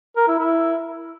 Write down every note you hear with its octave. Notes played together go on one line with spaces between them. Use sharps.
A#4
E4
E4